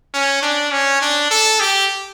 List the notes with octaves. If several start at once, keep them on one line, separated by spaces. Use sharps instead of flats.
C#4
D4
C#4
D4
A4
G4